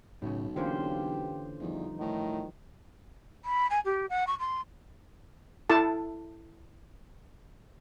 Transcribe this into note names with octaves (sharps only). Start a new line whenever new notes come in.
B1 A2 C#3
D3 E3 A#3 C#4 F4 G4 C5
E2 F3 G3 D#4
A2 D#3
B5
G#5
G4
F#5
C#6
C6
E4 A4 A5